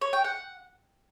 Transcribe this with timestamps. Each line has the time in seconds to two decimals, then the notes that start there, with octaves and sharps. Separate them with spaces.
0.01 C#5
0.13 G5
0.24 F#5